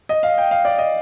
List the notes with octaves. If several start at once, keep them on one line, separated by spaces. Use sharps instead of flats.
D#5
F5
G5
F5
D5
D#5